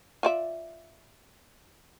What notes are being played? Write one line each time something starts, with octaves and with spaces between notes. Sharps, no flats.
F4 D5 E5